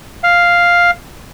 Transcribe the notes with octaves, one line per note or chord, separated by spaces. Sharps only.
F5